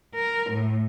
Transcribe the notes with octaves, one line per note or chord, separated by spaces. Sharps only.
A#4
A2